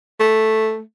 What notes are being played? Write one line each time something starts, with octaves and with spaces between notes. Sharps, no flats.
A3